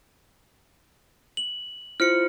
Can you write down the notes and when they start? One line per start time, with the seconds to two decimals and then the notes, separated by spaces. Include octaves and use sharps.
1.37 F#7
2.00 E4 F4 C5 F6 C#7